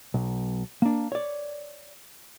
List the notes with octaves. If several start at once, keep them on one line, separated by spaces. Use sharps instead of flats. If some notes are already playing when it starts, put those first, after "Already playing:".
B1
A#3 D4
C#5 D5